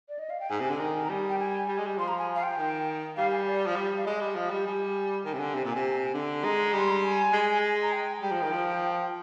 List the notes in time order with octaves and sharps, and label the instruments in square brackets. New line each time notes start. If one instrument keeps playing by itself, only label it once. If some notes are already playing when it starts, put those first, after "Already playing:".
[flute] D5
D#5
F5
G5
[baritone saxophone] G#2 [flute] G#5
[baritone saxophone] C3
D3
D#3
[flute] A#5
[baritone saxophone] G3 [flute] G#5
[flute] G5
G#5
[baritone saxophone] G3
G#3
G3
[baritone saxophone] F3 [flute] C6
[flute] A#5
G#5
F5
G5
[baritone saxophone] D#3
[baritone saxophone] G3 [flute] F5
[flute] G#5
D5
[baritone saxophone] F3
G3
[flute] F5
[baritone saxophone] G#3 [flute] D#5
[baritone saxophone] G3
F3
G3
[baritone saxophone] G3 [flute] G#5
[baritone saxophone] D#3 [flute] G#5
[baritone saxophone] C3
D3
C3
A#2
C3
D3
[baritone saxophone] G#3 [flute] A#5
[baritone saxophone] G3
[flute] C6
A#5
G#5
[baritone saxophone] G#3
[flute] A#5
G5
[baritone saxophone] G3 [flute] G5
[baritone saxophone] F3
D#3
F3